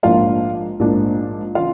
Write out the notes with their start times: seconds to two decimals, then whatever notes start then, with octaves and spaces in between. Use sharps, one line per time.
0.03 A#1 G#2 F3 A#3 D4 F4 F5
0.80 A#1 G#2 F3 A#3 D4
1.55 C#3 E3 F4 F5